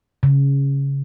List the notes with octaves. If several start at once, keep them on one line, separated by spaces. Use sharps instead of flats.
C#3